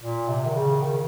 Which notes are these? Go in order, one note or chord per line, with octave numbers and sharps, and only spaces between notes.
A#2
C3
D#3
C#3
D#3